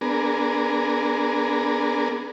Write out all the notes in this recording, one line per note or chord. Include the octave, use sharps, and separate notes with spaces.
B3 D4 G#4 A#4